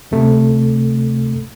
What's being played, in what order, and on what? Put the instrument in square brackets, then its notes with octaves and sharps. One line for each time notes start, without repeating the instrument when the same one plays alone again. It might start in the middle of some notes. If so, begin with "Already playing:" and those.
[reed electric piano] D2 C3 A3